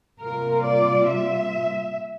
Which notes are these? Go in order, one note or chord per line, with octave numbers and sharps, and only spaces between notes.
C3 G3 A#3 F4 A#4
D5
E5